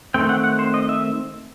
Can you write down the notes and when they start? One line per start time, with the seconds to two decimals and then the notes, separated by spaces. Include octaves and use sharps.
0.14 D#3 A3 C4 G5
0.29 F#5
0.44 F#5
0.59 C5
0.74 D#5
0.89 E5